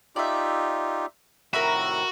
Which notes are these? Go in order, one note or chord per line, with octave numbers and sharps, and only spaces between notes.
D#4 F4 G4 D5 E5
A2 C3 D#3 F#4 A#4 E5 B5